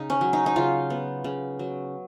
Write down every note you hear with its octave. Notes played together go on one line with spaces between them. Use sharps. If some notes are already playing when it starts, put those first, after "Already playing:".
Already playing: C#3 D#4
C#4
F#3
D#4
D#4
C#3 F4
B3
C#3
F#3